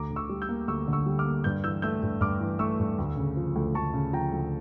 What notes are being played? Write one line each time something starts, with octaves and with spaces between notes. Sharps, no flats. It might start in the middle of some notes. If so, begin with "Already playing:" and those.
Already playing: D2 A#5 D6
D3
C#6 E6
G3
E6 G6
A#3
D2 C#6 E6
D3
C#6 E6
G3
D6 F6
A#3
G2 G6
E3 E6 G6
A3 E6 G6
G2
G2 D6 F6
E3
A3 C#6 E6
G2
D2
C#3
F3
D2
D2 A5 C#6
C#3
F3 G5 A#5
D2